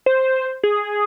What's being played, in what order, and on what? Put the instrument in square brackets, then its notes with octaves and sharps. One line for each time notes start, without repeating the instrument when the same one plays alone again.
[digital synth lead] C5
G#4